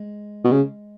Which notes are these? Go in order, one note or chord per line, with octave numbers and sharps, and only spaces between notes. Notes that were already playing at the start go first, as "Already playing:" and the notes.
Already playing: G#3
B2
C#3